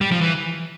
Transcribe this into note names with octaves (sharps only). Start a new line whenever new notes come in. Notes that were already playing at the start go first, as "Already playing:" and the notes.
G3
F3
E3